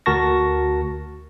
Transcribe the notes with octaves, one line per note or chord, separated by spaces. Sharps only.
D2 F#4 A#4 A5 C#6 A#6